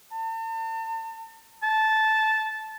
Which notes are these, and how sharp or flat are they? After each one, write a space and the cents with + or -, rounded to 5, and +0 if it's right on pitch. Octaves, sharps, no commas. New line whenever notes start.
A5 +40
A5 -10